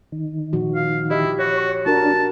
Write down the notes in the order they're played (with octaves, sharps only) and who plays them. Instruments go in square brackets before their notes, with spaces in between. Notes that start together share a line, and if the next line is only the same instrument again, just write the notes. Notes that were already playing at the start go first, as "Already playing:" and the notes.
[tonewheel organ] D#3
[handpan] A#2 F3 F#4
[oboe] F5
[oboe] E4 [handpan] G4 D#5
[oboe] F#4 [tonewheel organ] C#5
[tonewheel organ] D4 [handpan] F#4 A#4 [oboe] A5